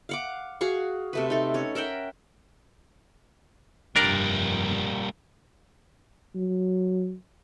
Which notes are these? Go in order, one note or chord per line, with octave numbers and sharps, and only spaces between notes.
F5 F#5 D6
F#4 G#4 F5 C#6
C3 A3 B4
D#4 A4
C#4 C#5
A#4 E5 F#5 G5
F1 G2 G3 A#3 D4 A#4 D5
F#3